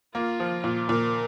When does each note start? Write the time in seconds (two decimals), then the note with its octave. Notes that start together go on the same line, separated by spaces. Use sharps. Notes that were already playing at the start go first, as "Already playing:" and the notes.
0.14 A#3 F4
0.40 F3
0.64 A#2
0.89 A#2 A#4